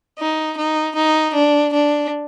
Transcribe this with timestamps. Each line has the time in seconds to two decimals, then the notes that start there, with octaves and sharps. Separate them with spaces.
0.19 D#4
0.58 D#4
0.95 D#4
1.34 D4
1.73 D4